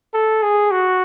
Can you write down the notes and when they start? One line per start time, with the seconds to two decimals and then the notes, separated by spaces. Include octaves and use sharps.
0.14 A4
0.42 G#4
0.71 F#4